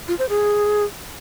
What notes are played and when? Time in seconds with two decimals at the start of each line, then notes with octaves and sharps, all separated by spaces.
0.08 F4
0.19 C5
0.29 G#4